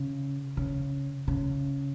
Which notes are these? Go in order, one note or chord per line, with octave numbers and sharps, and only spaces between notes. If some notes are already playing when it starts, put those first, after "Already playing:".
Already playing: C#3
C#3
C#3